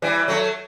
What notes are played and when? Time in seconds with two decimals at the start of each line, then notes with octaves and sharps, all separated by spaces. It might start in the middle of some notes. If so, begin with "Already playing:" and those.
0.02 E3 G3
0.28 F#3 A3